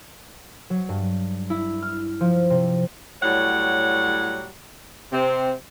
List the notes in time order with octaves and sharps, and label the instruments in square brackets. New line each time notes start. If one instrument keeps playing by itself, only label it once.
[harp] F#3
G2
E4
F6
F3
C3
[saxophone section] A2 F#3 G3 C#5 F#5
C3 C4